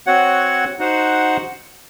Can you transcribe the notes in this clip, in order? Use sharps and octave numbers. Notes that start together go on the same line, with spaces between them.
C4 F#4 C#5 F#5
D#4 F#4 C5 F#5